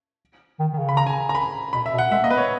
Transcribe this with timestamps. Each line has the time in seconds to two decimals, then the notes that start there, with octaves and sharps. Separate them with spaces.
0.59 D#3
0.73 D#3
0.78 C#3
0.89 B5
0.97 A#5
1.06 G#5
1.29 A#5
1.35 B5
1.73 B2 B5
1.86 E5
1.93 B2
1.98 F#5
2.11 G#3 E5
2.22 A#3 D#5
2.30 B3 B4
2.37 C#5